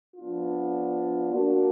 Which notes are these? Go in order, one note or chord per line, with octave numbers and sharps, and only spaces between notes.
F3 B3 D4 F4
A#3 D4 F#4